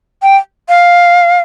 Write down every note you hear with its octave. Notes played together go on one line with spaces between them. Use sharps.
G5
F5